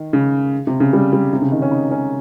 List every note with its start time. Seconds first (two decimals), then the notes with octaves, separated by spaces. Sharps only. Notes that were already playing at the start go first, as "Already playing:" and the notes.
Already playing: D#3
0.13 C#3
0.67 C3
0.80 C#3
0.93 G3
1.13 G3
1.33 C3
1.42 C#3
1.52 D#3
1.62 C#4
1.71 D#4
1.91 C#4